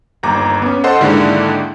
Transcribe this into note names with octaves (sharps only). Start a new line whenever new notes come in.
G1 D#2 A#5 D6
B3 C#4
A4 C5 D#5 F#5 C6
G#2 D3 D#3 G#3 A#3 E4